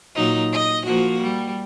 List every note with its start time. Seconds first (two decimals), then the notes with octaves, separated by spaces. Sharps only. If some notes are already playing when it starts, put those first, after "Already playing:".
0.15 A#2 F#3 D#4
0.53 D#5
0.86 F3 A#3 F#4
1.21 G3